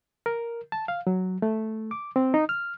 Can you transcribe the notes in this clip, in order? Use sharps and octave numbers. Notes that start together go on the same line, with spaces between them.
A#4
A5
F5
F#3
A3
D6
C4
D#4
F6